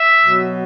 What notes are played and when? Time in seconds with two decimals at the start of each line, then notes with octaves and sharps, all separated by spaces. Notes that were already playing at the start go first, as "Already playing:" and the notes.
Already playing: E5
0.22 B2 F#3